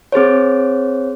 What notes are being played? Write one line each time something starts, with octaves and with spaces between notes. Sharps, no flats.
C4 G#4 C5 C#5